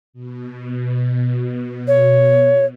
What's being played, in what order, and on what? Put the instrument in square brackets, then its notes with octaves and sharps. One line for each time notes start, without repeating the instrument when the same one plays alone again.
[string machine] B2
[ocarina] C#5